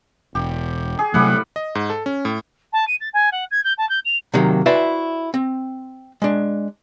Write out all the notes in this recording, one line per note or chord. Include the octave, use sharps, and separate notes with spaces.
E1 G4
G#4
A2 C3 F#3 G3 A3 F#5
D#5
G#2
A4
C#4
A2
A5
D#7
A6
G#5
F#5
G#6
G6
A5
G6
F7
C3 D#3 F#3 A#3
E4 F#4 B4 C5 D5 E5
C4
G#3 D4